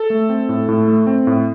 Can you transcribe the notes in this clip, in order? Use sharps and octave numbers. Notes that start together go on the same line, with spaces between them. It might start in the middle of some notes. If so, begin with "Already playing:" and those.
Already playing: A4
A3
C4
A2
A2
A3
C4
A2